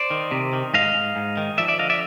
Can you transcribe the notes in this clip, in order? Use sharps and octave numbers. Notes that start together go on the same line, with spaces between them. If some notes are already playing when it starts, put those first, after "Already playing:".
Already playing: C5 D5
D#3
C3
D#3
G#2 D#5 F5
G#2
G#2
D#3
F3 D5 E5
D5 E5
D3 D#5 F5
D5 E5